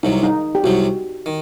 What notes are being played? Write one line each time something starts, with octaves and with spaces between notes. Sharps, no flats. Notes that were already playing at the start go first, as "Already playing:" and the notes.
C2 C3 F#3 D#4
D#4
G4
C2 C3 F#3 F#4
D#3